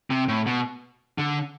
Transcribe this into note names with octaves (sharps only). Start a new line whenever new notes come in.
C3
A2
B2
D3